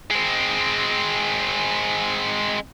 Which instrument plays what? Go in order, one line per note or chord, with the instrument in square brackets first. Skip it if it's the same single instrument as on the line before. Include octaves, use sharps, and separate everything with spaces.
[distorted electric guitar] G#3 C4